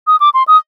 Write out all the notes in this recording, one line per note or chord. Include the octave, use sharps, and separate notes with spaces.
D#6
D6
C6
D#6